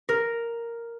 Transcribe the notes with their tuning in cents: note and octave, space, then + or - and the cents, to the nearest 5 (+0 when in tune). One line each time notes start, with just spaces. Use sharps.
A#4 +0